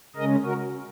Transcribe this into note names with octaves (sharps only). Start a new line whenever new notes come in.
C#3 G#3 C#4 A#4 D#5
F#4 A#4